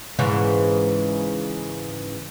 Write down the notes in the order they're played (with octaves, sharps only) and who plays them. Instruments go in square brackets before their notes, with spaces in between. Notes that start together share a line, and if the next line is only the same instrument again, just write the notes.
[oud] G#2 C#3 E3